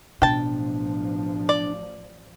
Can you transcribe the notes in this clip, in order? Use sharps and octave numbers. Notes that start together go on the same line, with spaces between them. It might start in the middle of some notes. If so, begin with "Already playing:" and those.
A1 B2 F3 D4 G5 A5
D5